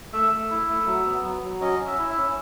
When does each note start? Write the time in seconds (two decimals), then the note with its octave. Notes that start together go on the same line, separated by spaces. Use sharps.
0.13 A3 E5
0.32 A3
0.51 E4
0.69 A3
0.87 F#3
1.06 B3
1.24 F#3
1.43 F#3
1.61 C#4 D#5
1.79 C#4
1.87 E5
1.99 E4
2.10 E5
2.17 C#4